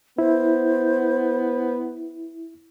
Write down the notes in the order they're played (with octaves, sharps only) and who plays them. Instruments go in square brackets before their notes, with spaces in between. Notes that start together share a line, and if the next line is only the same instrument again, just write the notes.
[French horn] B3 [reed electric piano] E4 [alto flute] C5